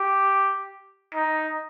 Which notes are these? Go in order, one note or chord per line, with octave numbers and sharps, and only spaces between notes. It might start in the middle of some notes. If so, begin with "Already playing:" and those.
Already playing: G4
D#4